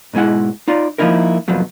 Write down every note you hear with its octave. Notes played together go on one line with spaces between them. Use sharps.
G#2 B2 G#3 E4 F#5
D#4 F4 D5
F3 G#3 A#3 D#4 E4 A#4
C2 F2 F3 F#3 B3